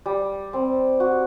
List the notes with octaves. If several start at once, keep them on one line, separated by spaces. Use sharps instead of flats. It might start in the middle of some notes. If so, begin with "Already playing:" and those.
G3
C4
F#4